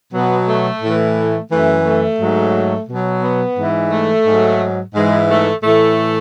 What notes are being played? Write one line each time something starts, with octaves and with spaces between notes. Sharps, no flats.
B2 F#3 B3
A3
A2
E3
A3
F#2 E3 A3
A3
G#2 F#3
B2 F#3
B3
G#2 E3
A3
G#2 F#3
G#2 E3 G#3
A3
A2 E3 A3